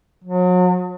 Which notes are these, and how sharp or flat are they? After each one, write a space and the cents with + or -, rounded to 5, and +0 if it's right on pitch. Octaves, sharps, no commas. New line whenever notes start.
F#3 -35